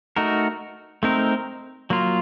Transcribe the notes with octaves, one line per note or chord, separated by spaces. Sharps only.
A3 D#4 F#4 A#4
A3 C4 D#4 A#4
F#3 A#3 F4